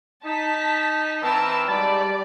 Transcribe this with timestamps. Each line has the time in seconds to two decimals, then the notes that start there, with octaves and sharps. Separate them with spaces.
0.25 D#4 A5 B6
1.22 E3 C4 A#4 B4 A5 E6
1.68 G#2 G3 D5 A5 B5